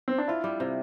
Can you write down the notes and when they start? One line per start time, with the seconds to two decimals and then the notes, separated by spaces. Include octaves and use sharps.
0.08 C4
0.18 D4
0.28 E4 F4
0.44 G3
0.60 C3